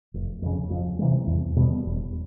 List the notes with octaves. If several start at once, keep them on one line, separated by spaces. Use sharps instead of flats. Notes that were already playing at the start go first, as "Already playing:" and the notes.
F1
F2 C#3
F2
C3 E3 G3
E2
B2 G3 B3
E1